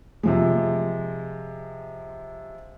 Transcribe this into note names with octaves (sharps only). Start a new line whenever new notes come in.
C3 F3 G#3